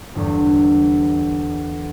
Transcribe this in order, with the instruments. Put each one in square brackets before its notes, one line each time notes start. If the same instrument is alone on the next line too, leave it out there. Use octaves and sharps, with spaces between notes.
[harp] G1 E2 G2